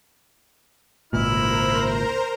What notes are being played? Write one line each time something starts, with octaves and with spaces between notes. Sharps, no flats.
G#1 C#2 A#2 E4 A#4 C5 A#5 F6